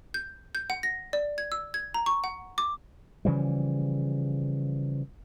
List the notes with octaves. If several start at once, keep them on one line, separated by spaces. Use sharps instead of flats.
G6
G6
F#5
A#6
D5
G#6
E6
G#6
A#5
C#6
F#5
D6
C#3 E3 F3 G3